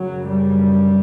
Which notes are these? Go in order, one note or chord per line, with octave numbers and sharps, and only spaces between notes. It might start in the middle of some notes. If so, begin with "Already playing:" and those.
Already playing: F#2 C#3 F#3
G3